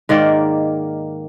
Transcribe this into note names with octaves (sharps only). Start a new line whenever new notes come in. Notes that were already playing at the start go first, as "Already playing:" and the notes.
G#2 D#3 A#3 D5